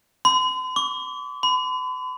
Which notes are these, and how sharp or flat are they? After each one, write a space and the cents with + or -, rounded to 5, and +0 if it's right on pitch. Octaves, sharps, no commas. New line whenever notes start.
C6 -45
D6 -40
B5 +45